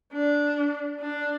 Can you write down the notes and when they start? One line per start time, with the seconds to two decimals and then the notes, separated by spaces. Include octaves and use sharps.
0.13 D4
1.00 D4